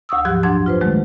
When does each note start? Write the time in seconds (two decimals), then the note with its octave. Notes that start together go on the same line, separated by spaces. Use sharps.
0.09 D2 F#5 C#6 D#6 E6
0.25 G#2 F3 F#3 G4 F#6
0.43 F#2 F#3 D4 F#5 C6 G#6
0.66 F4 B4 C5
0.81 D#3 F#3 G#3 A3